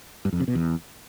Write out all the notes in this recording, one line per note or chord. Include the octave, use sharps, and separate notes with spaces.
G2
F2
C3
B2
E2